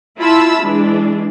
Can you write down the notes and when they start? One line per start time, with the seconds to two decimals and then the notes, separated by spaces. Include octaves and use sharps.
0.18 E4 F4 E5 A5 B5 E6
0.61 E3 G#3 D4